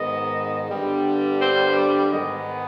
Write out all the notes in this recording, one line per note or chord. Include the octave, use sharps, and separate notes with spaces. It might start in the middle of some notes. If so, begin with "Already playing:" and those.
Already playing: G#2 D#3 B3 D#5
G2 D3 G3 B3
C5
D5
G#2 D#3 G#3 B3 D#5